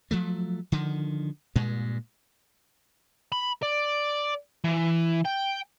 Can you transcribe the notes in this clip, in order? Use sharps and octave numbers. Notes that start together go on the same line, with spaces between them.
F3 F#3 A3
D3 D#3 F3
G2 A#2 G#3
B5
D5
E3
G5